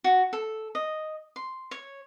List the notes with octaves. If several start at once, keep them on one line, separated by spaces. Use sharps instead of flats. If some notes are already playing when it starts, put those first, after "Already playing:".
F#4
A4
D#5
C6
C#5